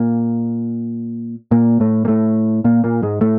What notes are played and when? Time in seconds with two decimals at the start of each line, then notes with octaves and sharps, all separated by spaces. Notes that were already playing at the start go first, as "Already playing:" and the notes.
Already playing: A#2 A#3
1.51 A#2 A#3
1.80 A2 A3
2.05 A#3
2.08 A2 A3
2.64 A#2 A#3
2.84 A#2 A#3
3.02 G#2 G#3
3.21 A2 A3